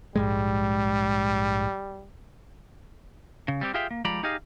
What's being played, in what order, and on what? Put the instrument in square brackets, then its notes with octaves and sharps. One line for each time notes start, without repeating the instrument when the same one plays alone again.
[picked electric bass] A#1 G#2 G#3 [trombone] G3
[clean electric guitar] C#3
G3 C4 G4
F4 G4 G#4 E5 F5 G5
A#3
F3 G3 G#3 D5 A#5 B5
D#4 G4 G#4 D#5 F5